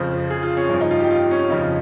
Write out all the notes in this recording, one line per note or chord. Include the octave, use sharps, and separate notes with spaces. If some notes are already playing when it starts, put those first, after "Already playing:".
Already playing: F2 C#3 F3 C5
G#4
F4
C#4
G2 F3
D#4
F4
G4
F4
C#4
F2 C#3 F3 D#4